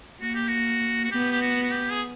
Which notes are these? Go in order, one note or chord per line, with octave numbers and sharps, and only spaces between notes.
A#3 F#4
G4
F#4
F#4
B3 G4
G4
F#4
F#4
G4
G#4